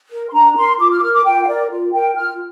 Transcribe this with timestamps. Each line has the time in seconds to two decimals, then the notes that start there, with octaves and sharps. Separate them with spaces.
0.11 A#4
0.29 C6
0.33 D4 A#5
0.57 A#4 C6
0.79 F4 D6
0.91 F6
0.97 D6
1.02 A#4 F6
1.13 D6
1.24 F4 G5
1.43 F5
1.47 A#4 D5
1.70 F4
1.93 A#4 G5
2.15 F4 F6